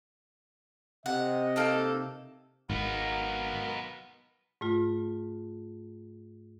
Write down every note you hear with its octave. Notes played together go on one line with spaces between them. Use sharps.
C3 D#5 F#5
A#3 D#4 A4
G#1 G#2 B3 D#4 F#4 A#4 F5
G#2 A3 F4